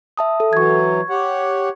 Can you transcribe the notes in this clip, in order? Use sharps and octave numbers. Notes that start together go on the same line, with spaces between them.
E5 A5 D#6
A4
E3 F#3 C#6 G#6
G4 C#5 F#5